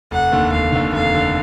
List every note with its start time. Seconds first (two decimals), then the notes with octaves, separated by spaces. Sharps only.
0.11 F1 F#5
0.32 D#2 D3
0.52 F1 F5
0.72 D#2 D3
0.93 F1 F5
1.15 D3